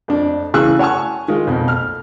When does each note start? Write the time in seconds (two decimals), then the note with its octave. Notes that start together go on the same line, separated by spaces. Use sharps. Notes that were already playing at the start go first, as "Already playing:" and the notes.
0.08 F2 D4
0.54 C#3 E3 G#4 C#6 E6 F#6
0.79 C#5 F#5 G#5 A5 C#6
1.28 D#3 G#3 F4
1.47 B1 F2
1.68 F6